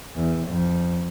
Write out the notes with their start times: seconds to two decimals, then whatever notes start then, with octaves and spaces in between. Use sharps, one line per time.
0.15 E2
0.47 F2